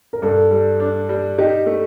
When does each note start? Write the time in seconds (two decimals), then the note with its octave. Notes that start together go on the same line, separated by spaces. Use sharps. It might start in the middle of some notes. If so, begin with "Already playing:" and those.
0.13 A#4
0.22 G2 A4
0.51 G3
0.80 D4
1.09 G3
1.38 D#4 G4
1.66 A3